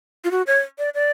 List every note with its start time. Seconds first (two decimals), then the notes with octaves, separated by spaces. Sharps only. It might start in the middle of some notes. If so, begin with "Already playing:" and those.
0.24 F4
0.31 F#4
0.47 C#5
0.79 D5
0.95 D5